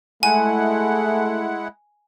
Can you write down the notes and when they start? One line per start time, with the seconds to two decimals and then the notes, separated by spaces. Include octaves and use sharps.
0.23 G#3 A3 E4 F#5 G#5